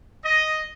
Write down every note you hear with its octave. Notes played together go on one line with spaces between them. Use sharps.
D#5